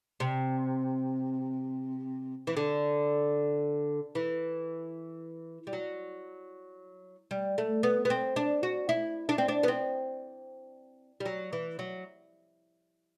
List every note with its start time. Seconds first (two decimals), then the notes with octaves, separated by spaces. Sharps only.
0.20 C3
2.47 E3
2.57 D3
4.15 E3
5.67 G3
5.73 F#3
7.31 G3
7.58 A3
7.83 B3
8.05 B3
8.10 C4
8.36 D4
8.63 F#4
8.89 E4
9.29 D4
9.38 C4
9.48 D4
9.63 B3
9.68 C4
11.20 G3
11.26 F#3
11.53 E3
11.79 F#3